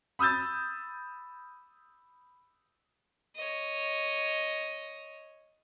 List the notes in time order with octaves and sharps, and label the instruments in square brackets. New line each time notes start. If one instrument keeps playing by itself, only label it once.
[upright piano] B5 D#6 E6 G6 A6
[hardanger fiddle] C#5 D#5